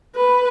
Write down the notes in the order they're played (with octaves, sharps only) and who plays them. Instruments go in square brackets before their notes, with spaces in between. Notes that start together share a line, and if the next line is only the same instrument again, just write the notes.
[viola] B4